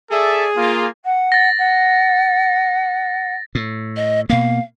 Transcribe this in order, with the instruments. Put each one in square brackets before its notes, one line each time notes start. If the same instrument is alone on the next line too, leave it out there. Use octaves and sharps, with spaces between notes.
[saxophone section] G#4 [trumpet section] A4 D5 E5
[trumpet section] A#3 F4
[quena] F#5
[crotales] A6 A#6
[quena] F#5
[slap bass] A2
[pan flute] D#5
[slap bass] B2 A#3 [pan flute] F5